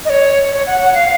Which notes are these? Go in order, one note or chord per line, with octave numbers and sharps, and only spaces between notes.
D#5
C#5
C#5
F#5
F#5
F5